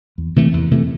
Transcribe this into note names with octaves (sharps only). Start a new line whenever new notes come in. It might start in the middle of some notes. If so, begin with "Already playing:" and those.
E2
C3 E3 A3
E2
C3 E3 A3